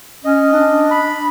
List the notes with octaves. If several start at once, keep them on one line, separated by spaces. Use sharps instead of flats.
C#4 D#5
D4
B5